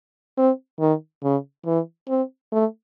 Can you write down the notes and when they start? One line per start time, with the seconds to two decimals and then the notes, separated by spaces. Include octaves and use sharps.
0.37 C4
0.80 D#3
1.23 C#3
1.66 E3
2.09 C4
2.52 A3